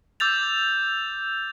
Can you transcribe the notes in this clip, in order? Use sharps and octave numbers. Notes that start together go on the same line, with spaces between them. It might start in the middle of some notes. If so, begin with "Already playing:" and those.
D6 E6 G6 A6 F7